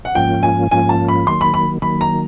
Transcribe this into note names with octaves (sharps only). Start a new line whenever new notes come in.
F#5
G#2 F3 A#3 C#4 F4 G5
G#5
G#2 F3 A#3 C#4 F4 G#5
A5
B5
D#3 F#3 A#3 C6
B5
B5
D#3 F#3 A#3 B5
A#5